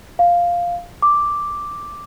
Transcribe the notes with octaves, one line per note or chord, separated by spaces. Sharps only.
F5
D6